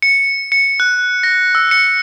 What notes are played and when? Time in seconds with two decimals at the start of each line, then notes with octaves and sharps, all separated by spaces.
0.02 C#7
0.52 C#7
0.80 F#6
1.23 A#6
1.55 E6
1.71 C#7